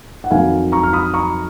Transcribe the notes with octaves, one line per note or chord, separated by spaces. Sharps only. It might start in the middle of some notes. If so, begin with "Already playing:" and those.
F#5
F2 D#3 F#3 F5 G#5
A#5 C#6
F6
B5 D#6
A#5 C#6